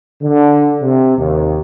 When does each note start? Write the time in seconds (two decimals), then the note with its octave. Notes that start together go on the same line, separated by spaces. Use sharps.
0.21 D3
0.81 C3
1.18 D#2